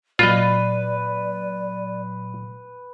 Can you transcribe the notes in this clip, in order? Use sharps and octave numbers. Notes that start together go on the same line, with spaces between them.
A#2 F#3 F4 B4 D5 D#5